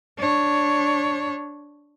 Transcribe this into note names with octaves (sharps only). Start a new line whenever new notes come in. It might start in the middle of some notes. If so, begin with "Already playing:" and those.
D4 C#5